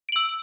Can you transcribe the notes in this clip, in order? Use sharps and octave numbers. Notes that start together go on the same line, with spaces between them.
E6 D7 F#7